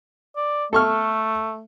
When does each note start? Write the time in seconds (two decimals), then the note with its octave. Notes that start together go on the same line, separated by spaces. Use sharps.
0.37 D5
0.73 A3 A4 C#6 F6